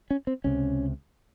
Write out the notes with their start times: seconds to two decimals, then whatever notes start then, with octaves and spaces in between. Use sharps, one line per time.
0.11 C#4
0.27 C4
0.44 C#2 C3 C#4